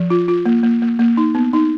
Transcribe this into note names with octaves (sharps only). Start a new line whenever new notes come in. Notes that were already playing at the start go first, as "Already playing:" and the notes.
Already playing: F3
F4
F4
A#3
A#3
A#3
A#3
D#4
B3
D#4